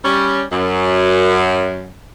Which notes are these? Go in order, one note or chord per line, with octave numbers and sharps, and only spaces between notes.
G3 C#4
F#2